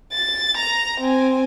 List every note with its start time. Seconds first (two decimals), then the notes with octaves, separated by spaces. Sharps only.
0.12 A6
0.57 A#5
1.01 C4 G#5